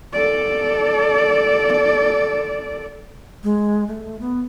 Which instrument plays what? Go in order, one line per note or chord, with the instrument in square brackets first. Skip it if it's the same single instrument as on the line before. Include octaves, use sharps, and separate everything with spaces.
[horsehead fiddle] A4 D5
[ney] G#3
A3
B3